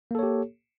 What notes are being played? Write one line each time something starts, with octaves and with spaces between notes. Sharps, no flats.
A#3 G4 A4 C#5